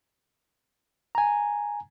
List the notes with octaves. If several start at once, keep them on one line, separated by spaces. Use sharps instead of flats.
G#5 A#5